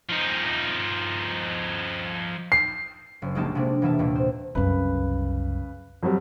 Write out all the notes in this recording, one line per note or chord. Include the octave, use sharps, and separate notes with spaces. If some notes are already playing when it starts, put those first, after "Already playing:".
F3 D#4
C7
F#1
A#1 G#3 A#3 D#4 G4 A5
C3 G#3 A#3 D4
E1 B2 E3 A#3 E5 A5
D#2 A#2
C5
C2 F#2 C#3 B4
F2 F#3 G3